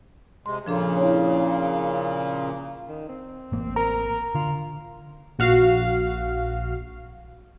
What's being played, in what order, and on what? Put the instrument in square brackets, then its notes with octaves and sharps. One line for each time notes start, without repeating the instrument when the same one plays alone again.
[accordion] C3 G#3 [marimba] C6
[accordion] A#2 C#3 A#3 [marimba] F3 D4 A4
[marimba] E4 C#5
[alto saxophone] D#3
C4
[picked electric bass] A1 A#3
[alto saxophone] A#4 [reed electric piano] A#5
[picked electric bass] D3 [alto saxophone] F4
[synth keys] A#1 F#4 F5